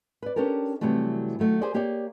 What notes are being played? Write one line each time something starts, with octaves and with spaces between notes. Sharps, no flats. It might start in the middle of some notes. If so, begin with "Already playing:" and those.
B4 D5
C#4 D4 G4 A4 A#4
C3 E3 F#3 G3 A3
D#3 F#3 A3
G4 G#4 A#4 C5 D5
A#3 G4 G#4 C#5 D5